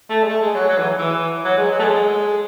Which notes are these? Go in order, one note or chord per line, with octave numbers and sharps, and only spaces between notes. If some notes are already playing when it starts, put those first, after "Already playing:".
A3
G#3
A3
G#3
F#3
F#3
E3
E3
F#3
G#3
F#3
A3
G#3